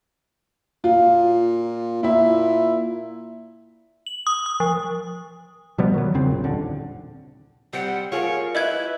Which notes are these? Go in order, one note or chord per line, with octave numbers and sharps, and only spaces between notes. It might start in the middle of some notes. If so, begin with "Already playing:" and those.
A#2 F4
A#2 E4 E5
F#7
D#6
D#6
F3
B2 F3 G3 B3
D#3 F#3
F2 C#3 C4
A#1
D#1 D3
G3 C4 F#5
F4 G#4 A#4 C#5
E4 B4 D#5 G6 G#6